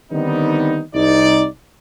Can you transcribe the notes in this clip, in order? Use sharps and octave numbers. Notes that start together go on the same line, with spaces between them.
D3 D#3 G3 B3 C4 D#4
C2 D#4 D5